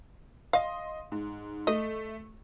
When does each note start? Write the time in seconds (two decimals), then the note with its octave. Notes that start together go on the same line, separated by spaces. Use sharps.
0.53 D#5 F5 C6
1.12 G#2
1.67 A3 D#5